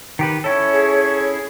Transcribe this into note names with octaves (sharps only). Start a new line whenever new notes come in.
D#3 G4 B4
C#4 E4 A4 C#5
G#4